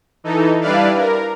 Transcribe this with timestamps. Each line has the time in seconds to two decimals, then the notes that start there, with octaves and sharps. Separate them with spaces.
0.24 E3 D#4 A4
0.61 G3 D4 E4 B4 D5 F5
0.96 A#4